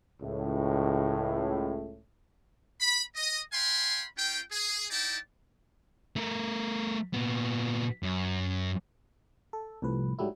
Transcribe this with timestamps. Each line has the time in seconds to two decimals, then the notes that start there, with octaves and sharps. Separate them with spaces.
0.21 C#2 A2
2.80 B5
3.15 D#5
3.53 F5 G5 G#5 B5 C6
4.17 C#4 F4 G5
4.51 G#4
4.90 D#4 E4 D5 G5 A5
6.16 A3 A#4
7.13 A#2 B3
8.03 F#2
9.53 A4
9.82 C2 A2 F3 B4
10.19 G#2 F#3 G3 A3 E4